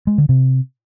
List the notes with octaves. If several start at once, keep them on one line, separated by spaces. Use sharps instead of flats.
G#3
D3
C3